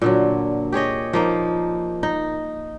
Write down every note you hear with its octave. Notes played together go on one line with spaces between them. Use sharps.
A#2 D3 F#3
G4 G#4 C#5 D#5
F3 A#3 D#4
D#4